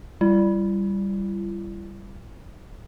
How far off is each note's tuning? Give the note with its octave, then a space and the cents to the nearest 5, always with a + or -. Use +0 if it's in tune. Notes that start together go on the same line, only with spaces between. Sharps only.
G3 +0 E4 +45